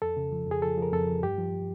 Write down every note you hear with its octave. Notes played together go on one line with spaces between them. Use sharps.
F2 A4
C#3
F3
F2 G#4
F3 A4
F3 A#4
F2 A4
F3
G2 G4
F3